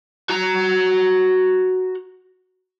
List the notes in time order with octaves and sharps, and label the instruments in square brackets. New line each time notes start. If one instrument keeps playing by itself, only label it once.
[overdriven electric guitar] F#4 A#5